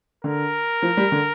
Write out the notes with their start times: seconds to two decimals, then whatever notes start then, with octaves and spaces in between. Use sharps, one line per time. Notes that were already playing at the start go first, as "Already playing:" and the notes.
0.24 D3 A#4
0.82 F3
0.97 G3
1.12 D3